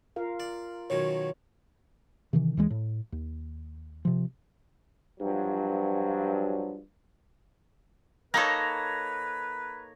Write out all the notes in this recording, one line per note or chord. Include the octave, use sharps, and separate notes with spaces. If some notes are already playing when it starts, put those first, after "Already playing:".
F4 A#4 F5
D5
B2 D#3 F#3 C#5
C3 D#3 E3
D#2 E3 G#3
A2
D#2
C3 F3
G2 F3 F#3
A#3 D#4 A4 B4 C#5 A#5